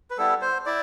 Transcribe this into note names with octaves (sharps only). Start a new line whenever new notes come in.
B4
G3 B3 E4 A4
C5
E4 D5